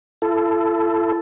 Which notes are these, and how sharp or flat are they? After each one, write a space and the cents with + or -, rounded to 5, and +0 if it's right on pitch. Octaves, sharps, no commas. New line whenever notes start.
E4 +40 A4 +0